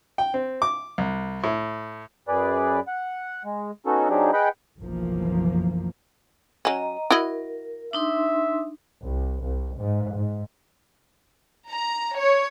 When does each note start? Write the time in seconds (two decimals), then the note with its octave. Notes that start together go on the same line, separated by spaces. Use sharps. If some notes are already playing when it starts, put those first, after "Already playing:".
0.18 G5
0.34 C4
0.62 D6
0.98 C2
1.44 A2
2.28 F#2 G#4 B4 D5
2.88 F#5
3.45 G#3
3.86 B3 C#4 D#4 F#4 A4
4.10 F#3 C4 D4 D#4 G4 G#4
4.33 G#4 B4 D#5 F#5 G5 B5
4.79 F#1 B1 F#2 E3 F3 A#3
6.65 F#3 C#4 D#5 A#5
7.11 E4 F#4 A#4 D#5
7.93 D4 D#4 E5 C6
9.02 C2
9.43 C2
9.77 G#2
10.16 G#2
11.70 A#5
12.17 C#5